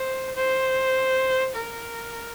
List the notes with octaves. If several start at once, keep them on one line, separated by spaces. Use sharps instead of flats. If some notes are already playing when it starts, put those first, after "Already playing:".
Already playing: C5
C5
A#4